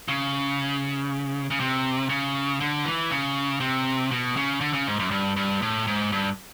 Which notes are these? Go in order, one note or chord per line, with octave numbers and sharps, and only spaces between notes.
C#3
C#3
C3
C#3
D3
E3
C#3
C3
B2
C#3
D3
C#3
G#2
F#2
G2
G2
A2
G#2
G2